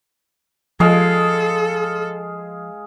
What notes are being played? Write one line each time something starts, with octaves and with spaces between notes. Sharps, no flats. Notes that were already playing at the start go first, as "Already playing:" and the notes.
F3 G#3 G#4 A4 F5